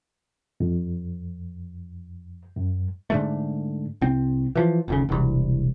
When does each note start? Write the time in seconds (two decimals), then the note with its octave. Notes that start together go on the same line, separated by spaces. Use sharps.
0.60 F2
2.56 F#2
3.10 G#2 D3 A3
4.01 C2 C4
4.55 E3 F3
4.88 F1 D2 C#3
5.09 E1 C2